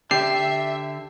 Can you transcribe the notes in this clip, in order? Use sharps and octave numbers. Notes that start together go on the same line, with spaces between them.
D3 G4 E5 C7